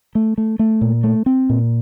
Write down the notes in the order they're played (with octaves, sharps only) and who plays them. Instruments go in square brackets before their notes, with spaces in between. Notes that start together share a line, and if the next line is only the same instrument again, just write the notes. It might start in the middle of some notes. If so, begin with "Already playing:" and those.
[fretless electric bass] A3
A3
A3
A#2
A3
C4
A#2